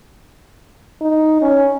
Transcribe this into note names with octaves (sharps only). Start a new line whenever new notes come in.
D#4
C#4